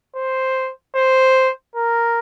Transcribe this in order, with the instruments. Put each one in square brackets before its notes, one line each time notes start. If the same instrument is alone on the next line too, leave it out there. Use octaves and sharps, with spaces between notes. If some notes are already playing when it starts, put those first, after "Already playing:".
[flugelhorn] C5
C5
A#4